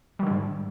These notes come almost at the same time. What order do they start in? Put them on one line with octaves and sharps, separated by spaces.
G3 D#3 D3 G#2